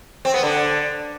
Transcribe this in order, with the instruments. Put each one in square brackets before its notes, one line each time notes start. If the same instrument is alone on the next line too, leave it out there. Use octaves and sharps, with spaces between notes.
[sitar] C4
B3
D3